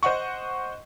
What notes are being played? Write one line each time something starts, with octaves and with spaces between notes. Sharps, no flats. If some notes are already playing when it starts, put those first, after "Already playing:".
C5 D#5 F#5 C#6